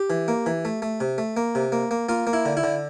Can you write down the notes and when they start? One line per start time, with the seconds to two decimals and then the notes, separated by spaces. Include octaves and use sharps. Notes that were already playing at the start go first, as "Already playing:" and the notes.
Already playing: G4
0.10 E3
0.28 A#3
0.46 E3
0.65 A3
0.82 A3
1.00 C3
1.18 A3
1.37 A#3
1.55 C3
1.72 A#3
1.91 A#3
2.09 A#3 F4
2.27 A#3
2.33 E4
2.45 D3
2.57 E4
2.63 D3